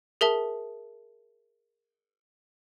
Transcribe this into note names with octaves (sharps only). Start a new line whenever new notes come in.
G#4 A#4 E5 A5